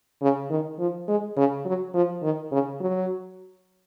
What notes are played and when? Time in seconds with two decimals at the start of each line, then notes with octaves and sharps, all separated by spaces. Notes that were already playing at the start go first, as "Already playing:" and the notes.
0.22 C#3
0.50 D#3
0.80 F3
1.08 G#3
1.37 C#3
1.66 F#3
1.95 F3
2.23 D#3
2.52 C#3
2.81 F#3